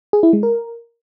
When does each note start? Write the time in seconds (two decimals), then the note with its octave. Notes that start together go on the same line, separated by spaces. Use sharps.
0.13 G#4
0.23 E4
0.33 G#3
0.43 A#4